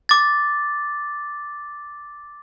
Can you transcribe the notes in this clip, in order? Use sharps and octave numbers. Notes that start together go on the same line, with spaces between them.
D6 A6